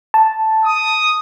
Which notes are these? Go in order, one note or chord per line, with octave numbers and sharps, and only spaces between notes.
A5
D#6